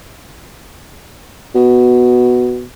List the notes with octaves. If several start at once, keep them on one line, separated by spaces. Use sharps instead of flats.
B2